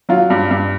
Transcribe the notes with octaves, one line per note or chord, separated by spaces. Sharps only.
F#3 F4
G2
G2